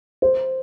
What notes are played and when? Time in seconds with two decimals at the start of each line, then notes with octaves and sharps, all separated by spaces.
0.22 C5